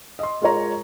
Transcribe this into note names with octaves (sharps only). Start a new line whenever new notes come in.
D#5 C6
G#3 F4 A#4 C#5 A#5